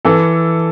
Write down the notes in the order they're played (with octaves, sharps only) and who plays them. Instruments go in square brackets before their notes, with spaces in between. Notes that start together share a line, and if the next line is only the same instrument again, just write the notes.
[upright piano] E3 A4